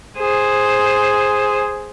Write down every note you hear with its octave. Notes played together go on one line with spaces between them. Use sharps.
G#4 C5